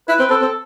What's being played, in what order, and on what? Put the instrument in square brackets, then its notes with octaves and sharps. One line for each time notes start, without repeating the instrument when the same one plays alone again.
[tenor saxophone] E4 [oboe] B4
[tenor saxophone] C4
[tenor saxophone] C4 [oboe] A4
[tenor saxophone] C4